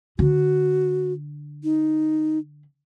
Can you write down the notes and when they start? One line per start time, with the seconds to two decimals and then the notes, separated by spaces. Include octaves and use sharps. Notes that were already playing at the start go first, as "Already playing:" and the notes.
0.19 D3 F#4
1.64 D#4